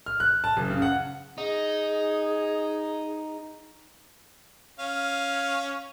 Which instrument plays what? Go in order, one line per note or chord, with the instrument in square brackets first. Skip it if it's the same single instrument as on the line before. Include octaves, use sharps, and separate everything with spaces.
[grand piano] F6
F#6
A5
F#1
C#3
F#5
[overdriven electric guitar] D#4 [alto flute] G#4
[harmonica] C#4 F5